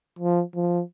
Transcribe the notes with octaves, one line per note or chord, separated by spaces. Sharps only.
F3
F3